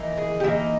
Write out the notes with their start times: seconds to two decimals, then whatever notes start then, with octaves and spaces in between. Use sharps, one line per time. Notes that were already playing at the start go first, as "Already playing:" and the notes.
Already playing: E3 A#3 D#4
0.18 G#4
0.40 G4
0.43 E3 A#3 D#4 E4